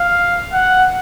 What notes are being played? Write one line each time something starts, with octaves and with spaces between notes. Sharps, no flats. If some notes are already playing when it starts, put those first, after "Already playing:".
Already playing: F5
F#5